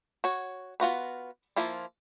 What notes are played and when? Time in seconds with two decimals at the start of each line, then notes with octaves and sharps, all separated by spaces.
0.24 F#4 C#5
0.80 B3 F4 F#4 B4
1.56 F3 A#3 E4 F4